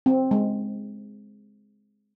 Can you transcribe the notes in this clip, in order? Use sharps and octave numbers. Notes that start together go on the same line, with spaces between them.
C4
G#3